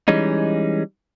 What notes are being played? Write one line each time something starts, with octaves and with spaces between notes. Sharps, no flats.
E3 G3 G#3 C#4 D#4